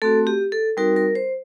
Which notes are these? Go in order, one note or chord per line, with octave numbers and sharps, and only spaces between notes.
A3 C4 F#4 A4
G4
A4
G3 C4 D#4 F#4 A#4
A#4
C5